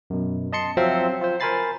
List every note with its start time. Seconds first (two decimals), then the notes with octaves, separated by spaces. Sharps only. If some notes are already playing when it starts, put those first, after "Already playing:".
0.10 F#2 B2
0.53 D#5 A5 C6 C#7
0.77 F3 F#3 C4 C5 E5 F5
1.21 F4 C5
1.40 A#4 C5 G#5 B5 A6 C7